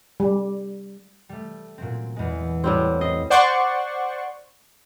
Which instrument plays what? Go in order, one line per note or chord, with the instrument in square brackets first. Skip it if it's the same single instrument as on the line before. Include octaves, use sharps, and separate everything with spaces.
[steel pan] G3
[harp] G3 A3
A#2 F#3 C4
E2 G#3
[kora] A2 G3 C4
[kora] D#5 [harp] C7
[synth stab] C5 D5 F#5 C6 C#6